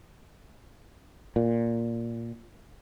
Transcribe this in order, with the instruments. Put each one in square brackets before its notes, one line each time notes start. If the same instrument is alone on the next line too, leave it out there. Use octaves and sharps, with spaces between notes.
[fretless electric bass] A#2